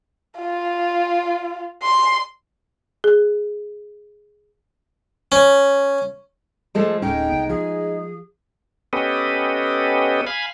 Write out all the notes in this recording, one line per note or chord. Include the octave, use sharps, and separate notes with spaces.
F4
C6
G#4
C#4
F3 G#3 A3 A4
D1 G#3 C#4 D#4 G5
C2 B3
F3 G#4
B3 C#4 G4 A4 B4 D#5
F5 G#5 B5